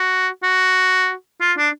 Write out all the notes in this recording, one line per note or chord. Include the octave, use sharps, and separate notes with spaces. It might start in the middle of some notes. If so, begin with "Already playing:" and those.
Already playing: F#4
F#4
F4
D4